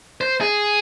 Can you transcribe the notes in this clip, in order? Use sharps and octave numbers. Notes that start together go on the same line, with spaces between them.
C5
G#4